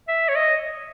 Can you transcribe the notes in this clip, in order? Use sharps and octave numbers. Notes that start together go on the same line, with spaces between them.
E5
C#5
D#5